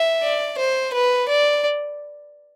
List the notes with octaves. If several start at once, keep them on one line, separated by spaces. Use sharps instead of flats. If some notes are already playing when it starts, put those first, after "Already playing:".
Already playing: E5
D5
C5
B4
D5